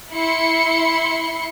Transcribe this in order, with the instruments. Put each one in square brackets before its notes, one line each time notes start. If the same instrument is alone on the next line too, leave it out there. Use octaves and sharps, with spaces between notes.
[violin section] E4 C6 C#7